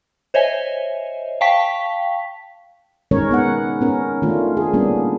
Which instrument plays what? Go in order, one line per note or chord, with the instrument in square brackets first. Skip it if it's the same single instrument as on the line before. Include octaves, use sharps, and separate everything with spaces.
[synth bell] C5 C#5 D#5 E5 G#5
F5 G5 A5 C#6 B6
[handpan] D#3 G#3 C#4 A#4 C#5
B3 D#4 F#5
B3 C#4 A#4
D#3 A3 D4 F4
G#4
G3 A#3 B3 C#4 D4